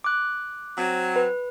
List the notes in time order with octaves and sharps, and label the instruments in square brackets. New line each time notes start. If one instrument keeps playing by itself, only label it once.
[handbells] D6 F#6
[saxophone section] F#3 C4
[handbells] B4